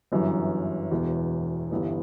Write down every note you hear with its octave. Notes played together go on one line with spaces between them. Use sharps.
G1 F#2 E3
E1 E2 B2
G1 G2 E3 B3